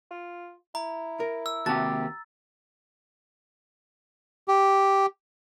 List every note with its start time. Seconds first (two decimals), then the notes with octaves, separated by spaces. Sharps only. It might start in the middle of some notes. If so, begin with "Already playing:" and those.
0.11 F4
0.75 E4 A#5
1.20 A#4
1.46 E6
1.66 D#2 C3 F#4 G4 A5 A6
4.48 G4